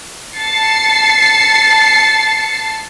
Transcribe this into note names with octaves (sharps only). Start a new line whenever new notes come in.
A5 A6 C7 C#7